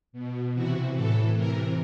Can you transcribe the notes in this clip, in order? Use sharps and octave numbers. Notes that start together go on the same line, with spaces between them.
B2
C3 E3 F#4
A2 E3 A4
C3 E3 A#4